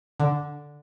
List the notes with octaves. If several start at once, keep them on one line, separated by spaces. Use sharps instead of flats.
D3